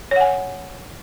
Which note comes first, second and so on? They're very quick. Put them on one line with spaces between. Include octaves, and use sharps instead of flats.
C#5 F#5 G#5